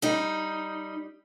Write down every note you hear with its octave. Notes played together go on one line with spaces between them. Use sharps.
G3 D#4